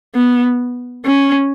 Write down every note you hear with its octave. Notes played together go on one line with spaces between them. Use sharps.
B3
C#4